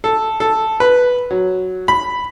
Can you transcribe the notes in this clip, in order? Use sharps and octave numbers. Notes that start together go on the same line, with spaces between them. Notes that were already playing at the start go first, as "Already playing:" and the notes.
A4
A4
B4
F#3
B5